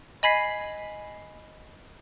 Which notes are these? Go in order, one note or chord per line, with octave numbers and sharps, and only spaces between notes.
D#5 G#5 B5 G#6 B6 C7